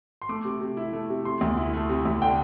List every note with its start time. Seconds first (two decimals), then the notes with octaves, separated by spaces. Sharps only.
0.22 C6
0.29 A3 D6
0.45 C3
0.61 C3
0.77 E4
0.93 A3
1.10 C3
1.25 C3 C6
1.41 D2
1.57 E4
1.73 A3
1.89 C3
2.05 D2
2.22 D3 G5